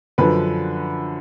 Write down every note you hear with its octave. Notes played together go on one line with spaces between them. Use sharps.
F#2 D3 F3 B4